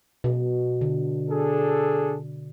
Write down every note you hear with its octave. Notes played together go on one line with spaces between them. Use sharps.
B2
D3
D4 G#4 A4